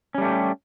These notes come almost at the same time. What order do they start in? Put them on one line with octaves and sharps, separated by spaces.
C#4 G3 A3 G4